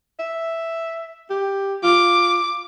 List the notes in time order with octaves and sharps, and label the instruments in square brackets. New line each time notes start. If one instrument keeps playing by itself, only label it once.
[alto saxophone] E5
G4
[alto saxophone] F4 [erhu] D6